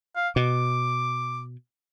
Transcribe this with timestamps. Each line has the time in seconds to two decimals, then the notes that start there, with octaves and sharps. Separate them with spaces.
0.16 F5
0.36 B2 D6